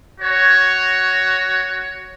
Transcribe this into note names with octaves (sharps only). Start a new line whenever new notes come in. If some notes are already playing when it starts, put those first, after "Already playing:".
F#4 C#5